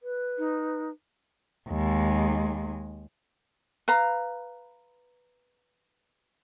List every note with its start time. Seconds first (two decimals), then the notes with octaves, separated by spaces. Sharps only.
0.03 B4
0.38 D#4
1.69 D#2 G#3
3.88 B4 F5 A#5